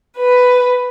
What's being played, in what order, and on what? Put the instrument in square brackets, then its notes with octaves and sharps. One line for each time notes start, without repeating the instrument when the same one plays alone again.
[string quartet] B4